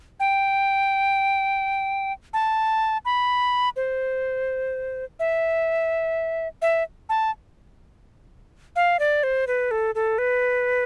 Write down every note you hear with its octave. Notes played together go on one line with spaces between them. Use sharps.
G5
A5
B5
C5
E5
E5
A5
F5
D5
C5
B4
A4
A4
B4